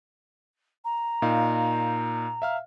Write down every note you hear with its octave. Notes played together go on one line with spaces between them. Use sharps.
A#5
A#2 D#4 F5
E5 F5 F6